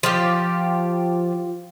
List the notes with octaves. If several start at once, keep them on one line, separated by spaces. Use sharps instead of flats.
F3 F4 G4